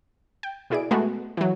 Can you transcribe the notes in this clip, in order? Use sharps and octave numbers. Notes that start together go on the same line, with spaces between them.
G5
B2 E4 G#4 D5 D7
G#3 A3 B3 F#4
E3 F#3